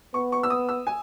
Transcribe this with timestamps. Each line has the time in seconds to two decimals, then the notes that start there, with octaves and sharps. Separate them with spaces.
0.14 B3 C#6
0.32 C#6
0.43 E6
0.50 D#6
0.69 E6
0.87 G#5